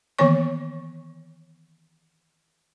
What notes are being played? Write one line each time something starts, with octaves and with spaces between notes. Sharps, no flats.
D#3 E3 A#3 B3 C#5 C#6